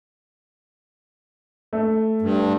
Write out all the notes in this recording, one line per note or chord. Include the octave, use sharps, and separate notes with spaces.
A3
G2